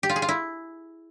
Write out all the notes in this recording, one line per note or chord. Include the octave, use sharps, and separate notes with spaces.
G4
F4
G#4
F4
E4